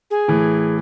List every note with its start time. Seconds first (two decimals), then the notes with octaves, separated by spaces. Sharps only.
0.11 G#4
0.28 A2 E3